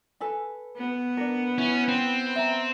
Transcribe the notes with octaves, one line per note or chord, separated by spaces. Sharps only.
A4 B4 G#5
B3
D4 A#4
C#4 E4
C4
E5 A#5